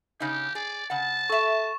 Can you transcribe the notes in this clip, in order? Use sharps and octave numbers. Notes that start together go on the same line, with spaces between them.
C#3 D#4 G4
G#4 D5
C#3 F#5 A5
A4 E5 C#6 E7